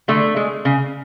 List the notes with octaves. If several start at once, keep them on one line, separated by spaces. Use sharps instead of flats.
D3 A3
G#3
C#3